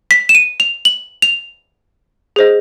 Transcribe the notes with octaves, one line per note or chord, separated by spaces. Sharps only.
B6
E7
D#7
F7
F#7
F7
G#4 C5 D#5